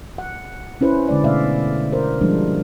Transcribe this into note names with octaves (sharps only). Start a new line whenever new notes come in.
F#5
C#4 E4 B4 C5
D3 G#3 D5
B2 A3 D5 E5 F5
A#4 C5
F3 G3 G#3 D4